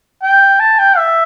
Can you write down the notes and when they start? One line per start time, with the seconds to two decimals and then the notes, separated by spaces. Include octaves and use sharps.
0.23 G5
0.60 A5
0.79 G5
0.98 E5